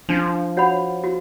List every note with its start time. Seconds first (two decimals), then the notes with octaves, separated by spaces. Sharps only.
0.09 F3 D4
0.57 F#4 C#5 F#5 B5
1.04 F#4